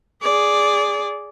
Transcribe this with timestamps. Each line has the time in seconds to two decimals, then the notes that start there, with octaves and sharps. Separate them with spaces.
0.23 G#4 D5